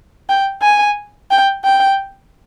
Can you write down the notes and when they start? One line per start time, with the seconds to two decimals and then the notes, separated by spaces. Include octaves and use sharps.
0.29 G5
0.63 G#5
1.31 G5
1.65 G5